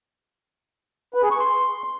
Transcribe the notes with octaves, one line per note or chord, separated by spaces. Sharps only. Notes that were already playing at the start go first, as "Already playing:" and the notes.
B4
G#4
C#6
C6